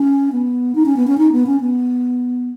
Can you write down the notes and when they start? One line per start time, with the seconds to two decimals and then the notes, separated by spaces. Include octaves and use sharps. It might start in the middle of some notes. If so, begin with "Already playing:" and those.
Already playing: C#4
0.32 B3
0.75 D#4
0.86 C#4
0.96 B3
1.07 C#4
1.18 D#4
1.32 B3
1.47 C#4
1.61 B3